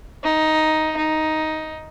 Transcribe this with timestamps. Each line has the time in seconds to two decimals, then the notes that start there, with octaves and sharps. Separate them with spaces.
0.23 D#4
0.97 D#4